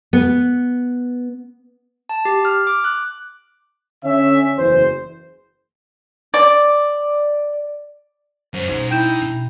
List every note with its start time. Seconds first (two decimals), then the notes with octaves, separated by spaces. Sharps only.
0.13 B3
2.09 A5
2.25 G4
2.45 F6
2.67 D6
2.84 F#6
4.04 D3 C#4 E5
4.58 F#1 E2 E3 C5
6.34 D5
8.54 F#2 C5
8.69 B2 C#4 D#4 C6
8.91 E4 G5 G6 E7
9.22 B2